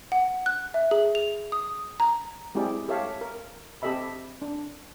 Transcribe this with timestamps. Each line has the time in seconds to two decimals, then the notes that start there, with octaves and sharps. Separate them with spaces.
0.12 F#5
0.46 F#6
0.74 E5
0.91 G#4
1.15 F7
1.52 D#6
2.00 A#5
2.55 G#3 C4 E4 G4 G#4 D5
2.89 G4 A4 C#5 E5 F5
3.21 A#4
3.82 C4 G4 A4 D#5 E5 B5
4.42 D4